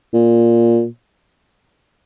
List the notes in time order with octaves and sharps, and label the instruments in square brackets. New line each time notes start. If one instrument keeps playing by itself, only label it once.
[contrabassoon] A#2